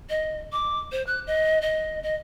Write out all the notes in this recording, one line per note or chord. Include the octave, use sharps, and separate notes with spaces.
D#5
D6
C5
F#6
D#5
D#5
D#5